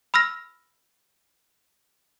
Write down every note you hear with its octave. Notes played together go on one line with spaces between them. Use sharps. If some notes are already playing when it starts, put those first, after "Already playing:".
B5 E6 F6 A#6